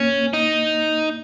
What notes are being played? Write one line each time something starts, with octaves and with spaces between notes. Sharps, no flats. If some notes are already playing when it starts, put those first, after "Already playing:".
Already playing: A#3 C#4
D#4